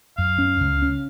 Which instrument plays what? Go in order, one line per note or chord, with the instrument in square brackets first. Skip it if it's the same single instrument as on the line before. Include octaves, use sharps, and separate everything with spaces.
[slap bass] F#2 [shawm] F5
[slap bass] C#4
C#2
C#4